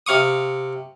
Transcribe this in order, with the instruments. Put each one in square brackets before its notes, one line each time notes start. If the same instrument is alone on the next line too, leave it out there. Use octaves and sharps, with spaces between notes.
[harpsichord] C3 F5 C#6 D#6